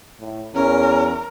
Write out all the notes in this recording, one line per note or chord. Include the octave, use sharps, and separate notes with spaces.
A2
E2 C#4 A#4